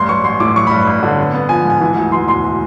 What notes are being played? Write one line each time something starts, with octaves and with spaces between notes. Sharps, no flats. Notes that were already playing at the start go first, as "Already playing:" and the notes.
Already playing: A1 G2 C6
F#3 C#6
A1 C6
A2 D6
F#3 C#6
G2 B5
A1
D3
B3
B3
F3 G#5
G#2
G#5
E3
D2
E3 C6
E1 C6